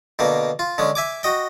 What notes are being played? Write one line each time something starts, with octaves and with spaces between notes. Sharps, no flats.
B2 D3 A#3
F4
D3 G#3 C#4
E5 G#5 D6
F#4 D#5 G5